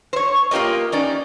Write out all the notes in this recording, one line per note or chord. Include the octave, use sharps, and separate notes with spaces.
C5 C#5
A#3 F4 G4 A#4 D#5
C#4 D#4 D5